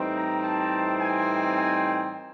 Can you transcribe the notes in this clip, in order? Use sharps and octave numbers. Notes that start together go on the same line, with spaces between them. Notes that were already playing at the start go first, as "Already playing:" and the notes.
Already playing: A2 E3 G3 C4 D#4
A#5
A5
G#5